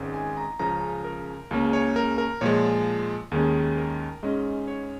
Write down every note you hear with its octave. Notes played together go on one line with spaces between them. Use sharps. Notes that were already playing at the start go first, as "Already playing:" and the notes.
Already playing: G#1 G#2 G#3 C#4
G#5
A#5
C#2 C#3 F3 C#4 A#5
A#4
C#2 C#3 A#3 C#4
C#5
A#4
A#4
A#2 F3 G#3 C#5
D#2 D#3 G#3 C#4 G#4
A#4
G#2 G#3 C#4 D#5
C#5